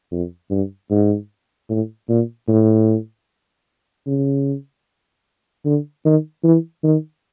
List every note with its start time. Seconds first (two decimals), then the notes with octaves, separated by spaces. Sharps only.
0.12 F2
0.51 G2
0.90 G#2
1.70 A2
2.09 A#2
2.48 A2
4.07 C#3
5.65 D3
6.05 D#3
6.44 E3
6.84 D#3